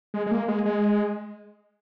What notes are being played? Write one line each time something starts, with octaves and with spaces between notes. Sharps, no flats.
G#3
G#3
A#3
G#3
G#3